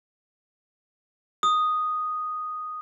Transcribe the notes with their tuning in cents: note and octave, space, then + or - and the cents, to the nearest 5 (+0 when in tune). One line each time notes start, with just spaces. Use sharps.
D#6 -5